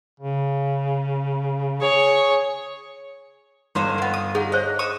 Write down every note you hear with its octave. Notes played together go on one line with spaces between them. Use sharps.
C#3
G#4 C#5
G1 D#4 C5 C#5
A#3 B3
D#6
D#4 G#4 F#5
G#4 C5 C#5 D#5
C#6 D#6 E6